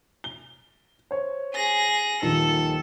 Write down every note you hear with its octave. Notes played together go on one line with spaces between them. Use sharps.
G7
C5 C#5
G#4 A#6
D#1 D#3 F3 A4